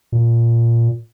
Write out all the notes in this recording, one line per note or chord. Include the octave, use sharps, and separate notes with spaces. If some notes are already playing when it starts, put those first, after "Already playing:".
A#2